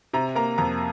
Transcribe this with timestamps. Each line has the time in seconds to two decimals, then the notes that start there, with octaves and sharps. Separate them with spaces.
0.13 C3 A#5
0.35 A#3 A#5
0.58 F2 A#5